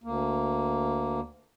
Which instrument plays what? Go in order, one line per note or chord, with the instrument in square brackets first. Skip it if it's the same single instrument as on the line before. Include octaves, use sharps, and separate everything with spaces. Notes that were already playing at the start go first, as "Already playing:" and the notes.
[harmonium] D2 A#3